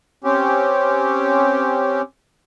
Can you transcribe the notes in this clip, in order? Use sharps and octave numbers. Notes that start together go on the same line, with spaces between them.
C4 C#4 G4